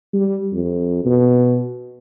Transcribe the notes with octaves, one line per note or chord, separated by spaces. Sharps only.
G3
F2
B2